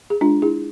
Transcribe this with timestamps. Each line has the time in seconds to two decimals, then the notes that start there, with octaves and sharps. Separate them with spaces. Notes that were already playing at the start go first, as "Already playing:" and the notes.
0.10 G#4
0.21 G#3 D4 F4
0.42 E4 G#4